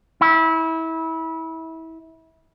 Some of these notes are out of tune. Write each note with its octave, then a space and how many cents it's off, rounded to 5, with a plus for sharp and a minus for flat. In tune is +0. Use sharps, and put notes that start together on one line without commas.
E4 -25